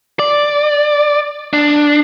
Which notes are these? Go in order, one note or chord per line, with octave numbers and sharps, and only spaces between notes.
D5
D4